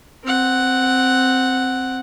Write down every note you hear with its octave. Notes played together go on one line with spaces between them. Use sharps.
C4 F#5